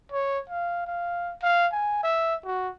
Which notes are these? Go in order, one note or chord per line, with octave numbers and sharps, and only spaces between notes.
C#5
F5
F5
F5
G#5
E5
F#4